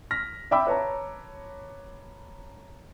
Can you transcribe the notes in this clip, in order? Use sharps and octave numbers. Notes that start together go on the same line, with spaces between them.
F6 A#6 B6
D5 E5 G5 B5 D6 E6
B4 C#5 A5 A#5